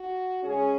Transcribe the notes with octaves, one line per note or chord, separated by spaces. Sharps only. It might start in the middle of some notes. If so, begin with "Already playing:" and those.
Already playing: F#4
C#3 G#3 C#4 G#4